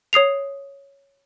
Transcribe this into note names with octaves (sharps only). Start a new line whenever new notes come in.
C#5 D#6 C7 F7